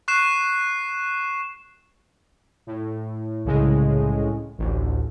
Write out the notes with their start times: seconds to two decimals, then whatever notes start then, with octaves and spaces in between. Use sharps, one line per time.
0.08 C#6 F#6 C7 E7
2.67 A2
3.45 C2 A2 C#3 G#3
4.58 A1 D2